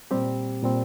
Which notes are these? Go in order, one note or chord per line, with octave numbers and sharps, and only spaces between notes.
A#2 G3 C4 G4
A#2 G3 C4